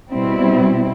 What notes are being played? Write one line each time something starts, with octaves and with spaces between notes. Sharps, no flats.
B2 G3 C4 E4